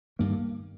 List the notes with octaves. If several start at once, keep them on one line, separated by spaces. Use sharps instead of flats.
G2 D#3 A#3